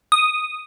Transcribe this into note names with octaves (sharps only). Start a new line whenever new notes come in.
D#6